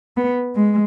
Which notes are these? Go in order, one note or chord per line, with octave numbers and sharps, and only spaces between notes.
B3
G#3